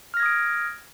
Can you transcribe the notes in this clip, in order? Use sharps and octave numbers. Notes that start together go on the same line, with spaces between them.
D#6 F6 G#6 A#6 D7